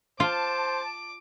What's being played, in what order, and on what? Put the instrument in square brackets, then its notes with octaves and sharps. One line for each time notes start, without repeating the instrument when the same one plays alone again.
[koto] F4 [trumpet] C5 [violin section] A5 [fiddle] D6